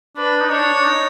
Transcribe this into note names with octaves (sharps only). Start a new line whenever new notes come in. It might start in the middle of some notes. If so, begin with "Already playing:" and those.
D4 B4
D#4
D4 C#5
D4
D#4